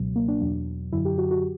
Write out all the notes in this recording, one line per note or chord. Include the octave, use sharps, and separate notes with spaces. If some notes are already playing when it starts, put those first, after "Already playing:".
Already playing: C#2 B2 F#3
A#3
D4
E2 B2 F#3
F#2 D3 F#3 E4
G4
F#4
F#4